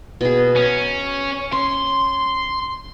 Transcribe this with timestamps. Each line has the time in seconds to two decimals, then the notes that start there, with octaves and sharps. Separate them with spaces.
0.21 B2 G#4
0.56 C#4 A#5
1.52 C#4 C6